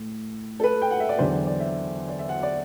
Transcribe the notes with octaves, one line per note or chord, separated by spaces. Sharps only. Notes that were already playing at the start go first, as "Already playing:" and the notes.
Already playing: A2
A4
B4
G5
F#5
E5
D5
E2 D3 F#3 C5
D5
D5
E5
D5
E5
F#5
D5